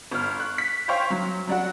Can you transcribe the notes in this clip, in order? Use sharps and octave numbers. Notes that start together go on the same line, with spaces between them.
G1 F6
C#6 F#6
B6
C5 C#5 F5 G5 C6 C#6
F#3
F#3 D4 F#4